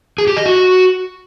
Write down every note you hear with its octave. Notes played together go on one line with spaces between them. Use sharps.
G#4
G4
D#5
F#4